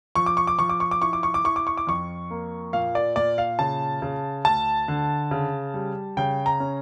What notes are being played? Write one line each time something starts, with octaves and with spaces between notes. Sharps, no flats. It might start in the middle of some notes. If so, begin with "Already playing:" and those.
F3 C#6
D6
C#6
D6
F3 C#6
D6
C#6
D6
E4 C#6
D6
C#6
D6
E4 C#6
D6
C#6
D6
F2 C#6
A#3
A#2 F5
D5
A#2 D5
F5
C#3 A5
C#3
D2 A5
D3
C#3
G3
C#3 G5
A#5
C#4